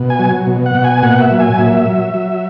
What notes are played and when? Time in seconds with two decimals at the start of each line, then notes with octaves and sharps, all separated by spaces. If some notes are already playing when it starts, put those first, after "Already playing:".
Already playing: B2
0.10 G#5
0.19 F#3
0.47 B2
0.66 F#5
0.75 B2
0.84 G#5
1.03 A#2 F#5
1.22 E5
1.31 F#3
1.40 G#5
1.58 A#2 E5
1.86 F#3
2.14 F#3